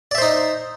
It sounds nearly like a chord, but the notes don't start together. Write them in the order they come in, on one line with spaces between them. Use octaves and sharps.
D5 E5 C5 D#4